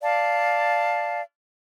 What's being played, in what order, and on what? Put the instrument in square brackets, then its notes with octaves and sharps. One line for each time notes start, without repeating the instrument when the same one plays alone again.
[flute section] D5 F5 A5